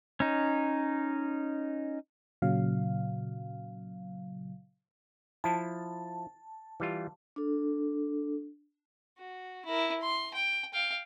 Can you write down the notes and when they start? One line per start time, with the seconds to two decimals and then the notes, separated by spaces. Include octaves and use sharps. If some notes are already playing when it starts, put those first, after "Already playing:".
0.20 C#4 D#4
2.42 A#2 C#3 F#3 F5
5.44 F3 E4 A5
6.80 E3 G3 F4
7.36 D4 A4
9.18 F#4
9.65 E4 A#4
10.01 C6
10.34 G5
10.74 F5 G5